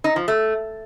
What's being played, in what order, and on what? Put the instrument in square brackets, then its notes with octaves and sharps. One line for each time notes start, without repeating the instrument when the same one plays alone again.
[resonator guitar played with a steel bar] D#4
F3
A3